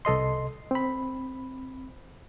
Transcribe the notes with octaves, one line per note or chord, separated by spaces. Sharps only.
C2 A4 D#5 C6
C4 B5